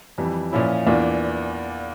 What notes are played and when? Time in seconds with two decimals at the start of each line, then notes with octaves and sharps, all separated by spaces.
0.18 F2 E3 G3
0.53 A#2 F3 C#4 E4
0.87 E2 E3 A#3 D4 F4